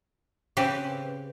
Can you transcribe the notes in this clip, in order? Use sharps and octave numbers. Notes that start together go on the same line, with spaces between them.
C#3 C4 G4 B4